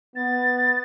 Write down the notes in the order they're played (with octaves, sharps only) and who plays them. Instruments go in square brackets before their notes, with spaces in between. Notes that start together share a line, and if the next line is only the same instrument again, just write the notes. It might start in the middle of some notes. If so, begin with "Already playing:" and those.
[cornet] B3 [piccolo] A6